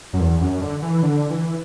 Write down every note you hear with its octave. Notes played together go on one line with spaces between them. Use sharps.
F#2
E2
F#2
D3
E3
D3
E3